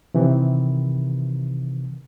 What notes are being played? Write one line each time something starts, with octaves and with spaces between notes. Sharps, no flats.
C3 D#3 E3